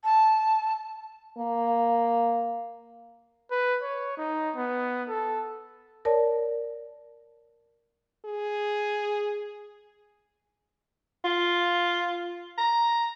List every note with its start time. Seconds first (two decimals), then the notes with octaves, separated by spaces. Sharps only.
0.04 A5
1.38 A#3
3.51 B4
3.82 C#5
4.17 D#4
4.56 B3
5.09 A4
6.05 A#4 C#5 D5 A5
8.25 G#4
11.24 F4
12.58 A#5